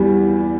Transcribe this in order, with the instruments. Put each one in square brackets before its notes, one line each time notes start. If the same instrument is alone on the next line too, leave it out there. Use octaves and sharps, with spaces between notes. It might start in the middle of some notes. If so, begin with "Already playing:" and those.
Already playing: [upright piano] E2 G3